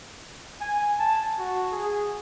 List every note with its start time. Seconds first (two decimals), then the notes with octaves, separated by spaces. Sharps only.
0.61 G#5
0.99 A5
1.38 F#4
1.72 G#4